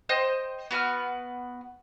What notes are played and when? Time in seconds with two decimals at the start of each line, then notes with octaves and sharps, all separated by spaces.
0.09 C5 D#5 G5
0.71 B3 F#4 B4 F6